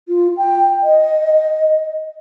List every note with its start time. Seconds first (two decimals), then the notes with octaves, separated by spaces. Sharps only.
0.09 F4
0.37 G5
0.83 D#5